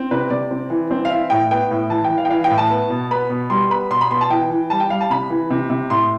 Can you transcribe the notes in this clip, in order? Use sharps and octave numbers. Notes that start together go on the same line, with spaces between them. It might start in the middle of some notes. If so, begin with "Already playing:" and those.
Already playing: C4
C3 B4
C3 D5
C4
E3
C4
F5
E3 E5
A2 G5
B3 G5
A2
E3 A5
G5
E3
F5
G5
E3 F5
G5
A2
A5
B3
B2
B3 B5
B2
G3 C6
B3 B5
B2 C6
B5
B2 C6
A5
E3 G5
E3
G3 A5
G5
G3 F5
A5
C3 B5
E3
C3
C3
A2 C6